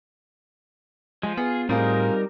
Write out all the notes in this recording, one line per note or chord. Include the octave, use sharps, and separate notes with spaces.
F3 G#3
B3 F4 G#4
A2 G3 C4 D#4 F4 G#4 A#4